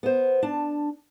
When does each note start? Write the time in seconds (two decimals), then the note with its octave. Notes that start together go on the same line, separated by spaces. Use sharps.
0.03 B3 C5
0.43 D4 A5